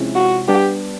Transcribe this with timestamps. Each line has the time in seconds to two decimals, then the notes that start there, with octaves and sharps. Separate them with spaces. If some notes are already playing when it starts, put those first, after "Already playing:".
Already playing: C3 F3 G#3 C#4 E4
0.15 F#4
0.48 G3 B3 D4 G4